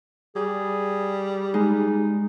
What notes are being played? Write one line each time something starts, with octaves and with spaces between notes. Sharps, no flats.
G3 G#4
G#3 D#4